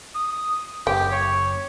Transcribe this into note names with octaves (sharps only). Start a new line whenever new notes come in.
D#6
F#1 G4 G5
C#5